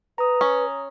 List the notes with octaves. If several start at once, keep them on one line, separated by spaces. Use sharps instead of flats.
B4 A#5 D#6
C#4